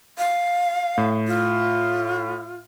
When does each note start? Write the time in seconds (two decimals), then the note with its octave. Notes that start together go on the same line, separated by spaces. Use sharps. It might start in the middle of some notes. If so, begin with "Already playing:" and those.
0.18 F5
0.98 A2
1.28 F4